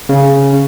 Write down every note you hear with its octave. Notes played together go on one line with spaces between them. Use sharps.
C#3